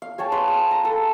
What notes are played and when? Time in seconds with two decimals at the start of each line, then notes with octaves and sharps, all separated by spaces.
0.02 F5
0.18 G#4 C#5 G5 A5
0.32 B4 C6
0.48 D#6
0.71 A#5
0.85 A4